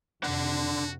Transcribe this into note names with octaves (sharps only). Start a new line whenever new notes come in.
F2 C3 D4 F#4 F#5